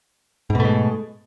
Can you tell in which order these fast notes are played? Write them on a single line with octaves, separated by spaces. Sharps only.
G#2 B2 A3 G#3